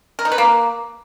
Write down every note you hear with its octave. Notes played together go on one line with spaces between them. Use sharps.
A#4
D#4
B4
A#3